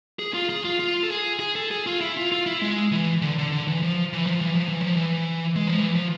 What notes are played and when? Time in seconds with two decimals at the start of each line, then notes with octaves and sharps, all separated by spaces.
0.19 G#4
0.34 F4
0.50 G#4
0.65 F4
0.79 F4
1.03 A4
1.11 G#4
1.40 G#4
1.55 A4
1.71 G#4
1.87 F4
2.01 E4
2.17 F4
2.32 F4
2.46 E4
2.62 G#3
2.92 E3
3.22 D3
3.38 D3
3.52 D3
3.68 E3
3.82 F3
4.13 E3
4.27 F3
4.41 E3
4.55 F3
4.68 E3
4.82 F3
4.96 E3
5.56 G#3
5.67 F3
5.80 E3
5.95 F3